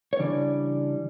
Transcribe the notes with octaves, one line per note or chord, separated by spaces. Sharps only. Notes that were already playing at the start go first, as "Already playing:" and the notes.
C#5
C#3 E3 G3 D4 D5